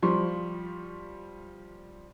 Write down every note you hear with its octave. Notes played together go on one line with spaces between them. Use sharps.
F3 G3 C6 C#6